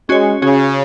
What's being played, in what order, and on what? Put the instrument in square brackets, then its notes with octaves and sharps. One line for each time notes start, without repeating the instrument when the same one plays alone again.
[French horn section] G#3 [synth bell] C#4 F#4 C#5
[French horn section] C#3 [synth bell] C#4 F#4 C#5